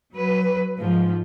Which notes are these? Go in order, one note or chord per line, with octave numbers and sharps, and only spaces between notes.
F#3 B4
G#2 F3